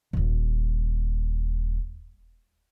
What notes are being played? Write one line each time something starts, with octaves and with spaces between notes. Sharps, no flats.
D#1 G#1